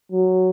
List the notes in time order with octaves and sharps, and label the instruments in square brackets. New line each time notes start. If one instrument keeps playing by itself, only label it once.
[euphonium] F#3